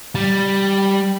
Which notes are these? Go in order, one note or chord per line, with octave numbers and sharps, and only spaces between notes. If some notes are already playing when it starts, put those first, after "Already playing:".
G3